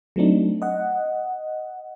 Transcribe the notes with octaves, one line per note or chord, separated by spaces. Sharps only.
F#3 A3 C4 D4 D#4
D#5 F#5